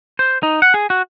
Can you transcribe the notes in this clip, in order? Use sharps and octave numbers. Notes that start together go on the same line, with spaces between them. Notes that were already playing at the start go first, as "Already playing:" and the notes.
C5
D#4
F#5
G#4
F#4